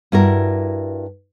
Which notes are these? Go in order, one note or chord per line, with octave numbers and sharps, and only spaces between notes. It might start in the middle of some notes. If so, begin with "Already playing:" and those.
G2 E4 F#4 A#4